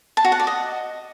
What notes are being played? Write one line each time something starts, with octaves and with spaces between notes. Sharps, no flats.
A5
F#4
F#5
D5
D#5